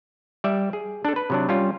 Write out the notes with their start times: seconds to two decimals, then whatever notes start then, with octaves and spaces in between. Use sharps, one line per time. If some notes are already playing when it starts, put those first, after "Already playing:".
0.44 G3 D5 E5
0.73 G#4
1.05 D4 A4
1.16 B4
1.30 C3 F#3 D4
1.49 G3 C#4 F4